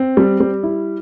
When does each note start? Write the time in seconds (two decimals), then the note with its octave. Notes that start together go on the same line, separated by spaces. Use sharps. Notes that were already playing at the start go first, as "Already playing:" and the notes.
Already playing: C4
0.17 G3
0.40 G3
0.63 E4